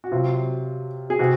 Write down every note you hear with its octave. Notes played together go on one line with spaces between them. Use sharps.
F#4
C3 F#3 F4
G#4
C3 F#4